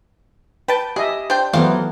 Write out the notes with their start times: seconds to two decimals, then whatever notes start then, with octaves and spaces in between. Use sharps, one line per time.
0.68 B4 G5 A5
0.96 G4 G#4 D#5 E5
1.30 D4 C5 G5
1.53 E3 F#3 A3 B3 F4 C5 F5